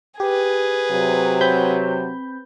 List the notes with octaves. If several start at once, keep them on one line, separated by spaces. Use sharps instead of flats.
G4 G#4 B4
C3 F#3
C4 B5 G6